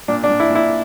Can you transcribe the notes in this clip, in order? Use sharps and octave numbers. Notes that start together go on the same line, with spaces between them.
A#2 D4
D4
A#2
E4
A#2
E4